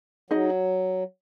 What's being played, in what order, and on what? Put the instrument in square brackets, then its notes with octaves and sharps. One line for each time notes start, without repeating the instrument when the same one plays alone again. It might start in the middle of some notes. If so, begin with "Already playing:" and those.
[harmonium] F#3 [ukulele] D#4 G#4 D#5